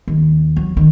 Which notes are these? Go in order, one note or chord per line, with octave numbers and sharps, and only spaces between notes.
D#2
F#3
D#3